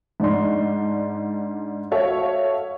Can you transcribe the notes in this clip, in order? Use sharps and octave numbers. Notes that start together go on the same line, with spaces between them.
G#2 D4 D5 C6
F#4 A4 C#5 E5 F5